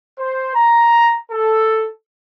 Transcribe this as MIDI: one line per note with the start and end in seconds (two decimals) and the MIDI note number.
0.18 0.51 72
0.54 1.17 82
1.31 1.87 69